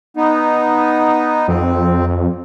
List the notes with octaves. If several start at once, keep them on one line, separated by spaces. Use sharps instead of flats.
B3 D#4
F2 C4